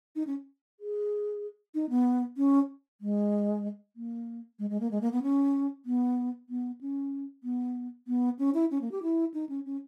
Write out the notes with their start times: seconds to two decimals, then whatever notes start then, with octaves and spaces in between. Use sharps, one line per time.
0.16 D#4
0.27 C#4
0.80 G#4
1.75 D#4
1.90 B3
2.37 C#4
3.01 G#3
3.96 A#3
4.59 G#3
4.70 G#3
4.80 A#3
4.91 G#3
5.01 A#3
5.12 B3
5.23 C#4
5.86 B3
6.49 B3
6.81 C#4
7.44 B3
8.08 B3
8.39 C#4
8.54 E4
8.71 C#4
8.81 A#3
8.92 G4
9.03 E4
9.34 D#4
9.49 C#4
9.65 C#4